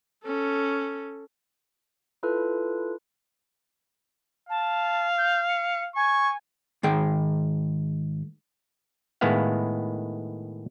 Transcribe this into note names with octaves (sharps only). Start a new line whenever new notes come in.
C#4 A4
E4 F4 A4 B4
F5 A5
G6
C#7
G#5 C#6
G#2 D#3 G#4 G5
A2 D#3 G#3 B3 E4 F5